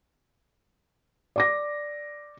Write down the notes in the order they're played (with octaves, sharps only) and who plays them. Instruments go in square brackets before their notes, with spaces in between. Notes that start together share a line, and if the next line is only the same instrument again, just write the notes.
[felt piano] D5 D6 A#6